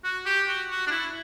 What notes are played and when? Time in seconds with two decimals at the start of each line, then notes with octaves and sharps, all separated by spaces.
0.04 F#4
0.26 G4
0.48 F#4
0.70 F#4
0.87 D4
0.91 E4